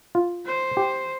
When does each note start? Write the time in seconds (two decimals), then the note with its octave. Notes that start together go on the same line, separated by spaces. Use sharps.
0.15 F4
0.46 C5
0.77 G4